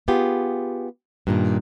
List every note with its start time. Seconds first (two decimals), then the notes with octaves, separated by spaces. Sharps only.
0.08 B3 F4 G4 G#4
1.27 G2 A#2 D#3